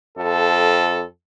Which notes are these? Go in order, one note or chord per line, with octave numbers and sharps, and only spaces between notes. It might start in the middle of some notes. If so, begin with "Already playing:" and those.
F2 A4